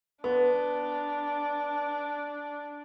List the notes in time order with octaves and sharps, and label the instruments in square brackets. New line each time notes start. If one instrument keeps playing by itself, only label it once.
[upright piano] B3 [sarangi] D4